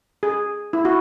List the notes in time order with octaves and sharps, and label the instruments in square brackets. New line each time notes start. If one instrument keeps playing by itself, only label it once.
[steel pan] G#4
E4
F#4